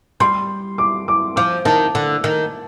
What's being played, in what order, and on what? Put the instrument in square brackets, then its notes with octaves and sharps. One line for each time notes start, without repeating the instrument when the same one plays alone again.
[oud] G3 [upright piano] C6
[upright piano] D6
D6
[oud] F3 [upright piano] D6
[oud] D#3 [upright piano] A5
[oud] D3
D#3